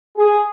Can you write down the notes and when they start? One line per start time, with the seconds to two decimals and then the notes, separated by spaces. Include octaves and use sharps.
0.17 G#4